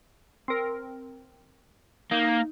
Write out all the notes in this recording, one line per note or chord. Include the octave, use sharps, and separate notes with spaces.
C4 A#4
A#3 D#4